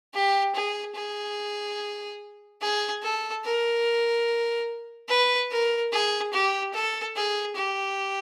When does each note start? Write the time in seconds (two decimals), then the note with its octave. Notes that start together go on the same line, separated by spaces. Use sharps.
0.14 G4
0.55 G#4
0.96 G#4
2.61 G#4
3.03 A4
3.44 A#4
5.09 B4
5.51 A#4
5.92 G#4
6.33 G4
6.74 A4
7.16 G#4
7.56 G4